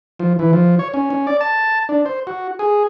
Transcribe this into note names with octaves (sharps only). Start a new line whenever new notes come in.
F3
E3
F3
C#5
C#4
C#4
D5
A5
D4
C5
F#4
G#4